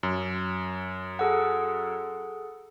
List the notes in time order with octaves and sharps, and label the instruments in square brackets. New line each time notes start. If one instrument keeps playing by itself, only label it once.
[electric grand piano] F#2
[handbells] G#4 A4 F#5